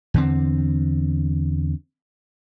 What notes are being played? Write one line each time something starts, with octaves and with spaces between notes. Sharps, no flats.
E2 D3 C4